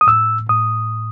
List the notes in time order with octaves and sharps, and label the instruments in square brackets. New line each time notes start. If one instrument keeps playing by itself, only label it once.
[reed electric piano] D#6
A2 E6
A2 D#6